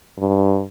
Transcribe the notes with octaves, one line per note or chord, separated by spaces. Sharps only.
G2